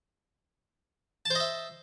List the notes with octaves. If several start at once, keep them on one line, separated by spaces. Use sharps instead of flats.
C5 D#5 E5 A5